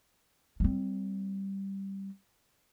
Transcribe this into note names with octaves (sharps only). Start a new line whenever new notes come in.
G3 C4